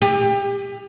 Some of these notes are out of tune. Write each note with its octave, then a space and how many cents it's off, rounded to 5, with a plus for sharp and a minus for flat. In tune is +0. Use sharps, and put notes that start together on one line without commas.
G4 +25